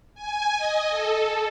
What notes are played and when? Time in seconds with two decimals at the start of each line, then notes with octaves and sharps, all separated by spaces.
0.15 G#5
0.57 D#5
0.89 A4